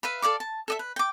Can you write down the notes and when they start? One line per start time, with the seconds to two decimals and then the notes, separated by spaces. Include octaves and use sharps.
0.03 B4 E5 F5 B5
0.22 A4 D5 F5 D6
0.40 A5
0.68 A4 D#5 E5
0.79 B4
0.96 G5 D6